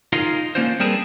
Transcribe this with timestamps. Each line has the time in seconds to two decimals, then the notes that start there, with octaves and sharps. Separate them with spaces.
0.13 D#4 F4 G#4 A#4 D#5 F5
0.55 A#3 C#4 D4 F4 C5
0.79 G3 C4 G#4 A#4 B4 A5